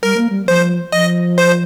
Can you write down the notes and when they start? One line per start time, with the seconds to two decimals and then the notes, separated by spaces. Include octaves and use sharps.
0.03 G3 A#4
0.17 A#3
0.30 G3
0.48 F3 C5
0.92 F3 D#5
1.38 C5